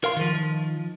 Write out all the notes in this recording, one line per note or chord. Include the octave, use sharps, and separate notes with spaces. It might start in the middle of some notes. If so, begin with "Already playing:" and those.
A#4 F5 C6
D#3 F3